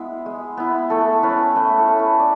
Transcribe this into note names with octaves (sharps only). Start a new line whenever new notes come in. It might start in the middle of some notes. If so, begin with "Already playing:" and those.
Already playing: G#3 B3 E4 G#4
G#3
B3 E4
A3 A4
C#4 E4 B4
A3 B4
A4
C#4 E4
B4
D5